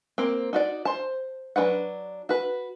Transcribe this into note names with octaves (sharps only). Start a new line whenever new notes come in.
A#3 C4
D#4 F#4 D5
C5 A5
F#3 D4 E4 B4 F#5
F#4 B4